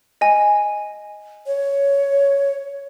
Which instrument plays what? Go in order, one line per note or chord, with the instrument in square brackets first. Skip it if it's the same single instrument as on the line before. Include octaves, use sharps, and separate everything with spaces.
[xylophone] D#5 G#5
[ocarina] C#5